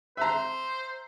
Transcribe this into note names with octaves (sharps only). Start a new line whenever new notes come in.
C5 E5 A#5